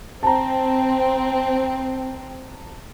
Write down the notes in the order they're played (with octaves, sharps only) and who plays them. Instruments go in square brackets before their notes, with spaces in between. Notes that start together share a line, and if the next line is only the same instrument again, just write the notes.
[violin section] C4 [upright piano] A5 A#5